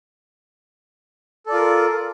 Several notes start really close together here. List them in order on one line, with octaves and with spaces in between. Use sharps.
A4 D5 F4 A#4